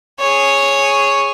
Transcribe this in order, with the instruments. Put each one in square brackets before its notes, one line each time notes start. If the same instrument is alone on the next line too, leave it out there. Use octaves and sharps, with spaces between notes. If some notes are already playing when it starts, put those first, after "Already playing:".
[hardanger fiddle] G#4 C#5